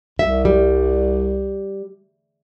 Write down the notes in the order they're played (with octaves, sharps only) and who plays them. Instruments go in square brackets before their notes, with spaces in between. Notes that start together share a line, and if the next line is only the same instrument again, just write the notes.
[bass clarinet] C2 [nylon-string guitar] E5
[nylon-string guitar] G3